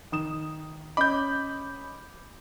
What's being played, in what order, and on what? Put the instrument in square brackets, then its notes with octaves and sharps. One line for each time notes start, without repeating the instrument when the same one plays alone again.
[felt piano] D#3 D#6 E7
[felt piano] C#4 D#5 D6 [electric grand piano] B5 G6